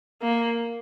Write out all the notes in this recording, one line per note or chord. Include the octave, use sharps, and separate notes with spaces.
A#3